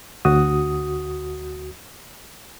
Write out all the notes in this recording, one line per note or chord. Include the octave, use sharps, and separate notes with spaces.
D2 F#4 D#6